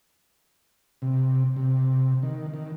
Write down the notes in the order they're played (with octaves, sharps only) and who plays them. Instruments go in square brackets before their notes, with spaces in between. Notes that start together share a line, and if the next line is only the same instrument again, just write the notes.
[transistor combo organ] C3
C3
D#3
D#3